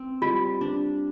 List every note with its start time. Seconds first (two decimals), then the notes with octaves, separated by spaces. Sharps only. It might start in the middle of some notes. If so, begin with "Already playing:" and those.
Already playing: C4
0.22 G3 F4
0.61 D4